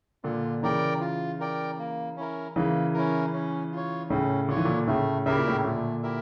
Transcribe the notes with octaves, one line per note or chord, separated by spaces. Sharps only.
A#2 D3 F4
C#3 E3 A#4 D5 G5
F4
A#4 D5 G5
A#3
C#4 E4 A#4
C#3 E3 A#3
C#4 E4 A#4
C#4
F4 C#5
A2 C#3 C#4
D3 F4 C#5
E3
A#2 D3
A2 C#3 A3
C#3 E4 G4 A#4 E5
A#2
A2 C#3
A#2 D3 A3
E4 G4 A#4 E5